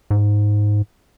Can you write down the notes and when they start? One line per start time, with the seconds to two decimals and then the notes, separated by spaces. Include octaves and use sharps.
0.11 G#2